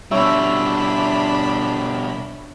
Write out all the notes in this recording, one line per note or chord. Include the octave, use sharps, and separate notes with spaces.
B2 G3 D4 C#5 E5 B5